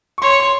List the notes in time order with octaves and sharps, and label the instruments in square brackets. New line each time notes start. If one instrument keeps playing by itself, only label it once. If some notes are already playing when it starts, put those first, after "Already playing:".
[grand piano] C#6
[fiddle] C#5 [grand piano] C6
[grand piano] C6